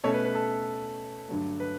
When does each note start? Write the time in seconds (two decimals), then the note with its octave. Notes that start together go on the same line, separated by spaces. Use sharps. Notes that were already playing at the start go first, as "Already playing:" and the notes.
0.04 B2 A3 C#4 A4 C#5
0.14 B4
0.25 B4
0.35 A4
1.29 G2 D3 F#3 A3
1.60 B4